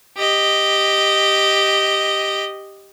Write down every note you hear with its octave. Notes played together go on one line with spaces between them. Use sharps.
G4 D#5